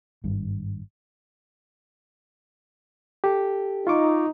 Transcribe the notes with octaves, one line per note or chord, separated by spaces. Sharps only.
G#1 G2
G4 A4
D#4 F4 C#6 D6